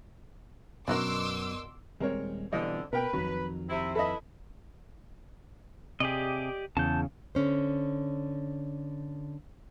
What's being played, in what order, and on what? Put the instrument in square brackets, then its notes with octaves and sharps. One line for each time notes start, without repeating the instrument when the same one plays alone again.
[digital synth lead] F#2 [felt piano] B2 [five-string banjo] D4 F#4 A#4 [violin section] C6 D6 E6
[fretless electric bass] D#1 G3 G#3 [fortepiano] C4 A#4 C#5
[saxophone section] F2 D3 [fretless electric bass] B2 E3 G3 [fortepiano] D#5
[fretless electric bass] B2 [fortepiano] A#4 G5 [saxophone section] B4
[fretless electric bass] F2 D#3 [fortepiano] F#3
[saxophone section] C3 C4 E4
[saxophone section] E4 B4 [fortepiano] A4 D#5
[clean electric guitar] C3 G#4 [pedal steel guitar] G4 D5 D#5
[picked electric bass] E2 [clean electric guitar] C#3 [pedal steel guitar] A5 G6
[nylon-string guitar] D3 C#4 C5